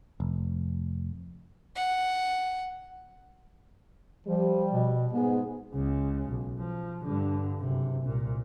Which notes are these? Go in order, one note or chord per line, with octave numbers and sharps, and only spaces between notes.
F1
F#5
F3 G3
B2
G#2 B3 G#4
C#2 C#3
B1
F3
G2 D3
F#1 C3
C2 A#2